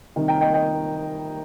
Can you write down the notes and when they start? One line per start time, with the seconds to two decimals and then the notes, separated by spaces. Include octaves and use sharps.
0.16 C3 D#3 G3
0.28 G5 A#5
0.41 D#5 G5
0.54 D#5 G5